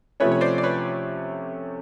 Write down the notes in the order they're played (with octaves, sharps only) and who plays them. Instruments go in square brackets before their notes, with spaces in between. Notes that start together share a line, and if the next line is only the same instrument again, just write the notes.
[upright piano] C3 F3 A3 C#4 [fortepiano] B4 C#5
[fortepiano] C#5
C5 D5
D5
B4 C#5